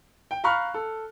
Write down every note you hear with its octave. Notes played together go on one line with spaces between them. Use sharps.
G5
F5 A#5 B5 C#6 F6 F#6
A4